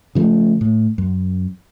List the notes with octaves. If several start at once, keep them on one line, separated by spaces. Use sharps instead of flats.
C#3 F3 G3 A3
A2
F#2